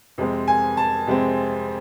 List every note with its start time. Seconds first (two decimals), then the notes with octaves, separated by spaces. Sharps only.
0.18 F2 C3 G#3 C4
0.48 G#5
0.77 A5
1.07 F2 C3 G#3 C4